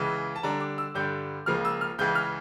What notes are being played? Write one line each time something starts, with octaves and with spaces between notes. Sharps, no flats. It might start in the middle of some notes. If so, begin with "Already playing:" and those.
Already playing: C#2 C#3 E3
A5
D3 G3 D4 A#5
D6
E6
G2 D3 G3 D4 G6
C#2 C#3 F3 A#3 F6
E6
F6
C#2 C#3 E3 G6
F6